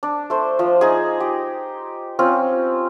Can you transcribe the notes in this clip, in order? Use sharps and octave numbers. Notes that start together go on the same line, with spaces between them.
D4
A3 C5
F3
D#4 G#4
G4
C4 C#4 F4